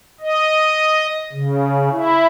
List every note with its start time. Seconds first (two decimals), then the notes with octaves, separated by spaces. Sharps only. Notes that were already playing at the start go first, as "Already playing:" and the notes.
0.21 D#5
1.32 C#3
1.91 E4